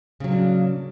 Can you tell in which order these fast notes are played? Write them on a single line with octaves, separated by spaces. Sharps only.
C#3 F#3 A#3 D4